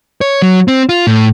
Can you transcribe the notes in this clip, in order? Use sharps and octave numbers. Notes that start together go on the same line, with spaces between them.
C#5
F#3
C4
F4
A2